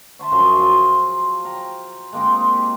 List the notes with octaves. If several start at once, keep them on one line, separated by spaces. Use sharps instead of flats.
E5 A5 C6 C#6
F#2 F3 G#4 C6
F4
G5 A#5
G#3 A#3 C4 D#4
G4